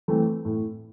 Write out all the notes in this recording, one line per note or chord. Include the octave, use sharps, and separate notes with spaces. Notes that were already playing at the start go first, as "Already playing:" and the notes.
E3 A3 C4
A2